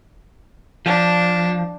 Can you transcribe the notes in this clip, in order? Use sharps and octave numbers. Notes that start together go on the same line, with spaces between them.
F3 D4